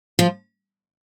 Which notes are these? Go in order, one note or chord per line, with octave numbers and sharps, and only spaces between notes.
F3 F4